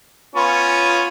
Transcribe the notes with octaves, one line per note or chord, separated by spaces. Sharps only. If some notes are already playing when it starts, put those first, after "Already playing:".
B3 C#4 F4